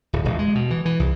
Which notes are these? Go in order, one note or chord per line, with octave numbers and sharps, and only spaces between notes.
D1
D#1
G#3
B2
E3
E3
C2